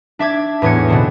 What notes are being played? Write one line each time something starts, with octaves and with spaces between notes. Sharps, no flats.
D4 E5 D6 G#6
E2 A2 B3 G#6 C#7
B2 D3 C4